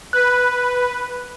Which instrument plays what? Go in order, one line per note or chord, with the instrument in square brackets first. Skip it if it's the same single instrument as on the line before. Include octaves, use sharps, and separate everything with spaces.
[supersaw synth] B4 [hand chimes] F#6